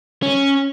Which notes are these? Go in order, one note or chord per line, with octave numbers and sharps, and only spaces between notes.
C#4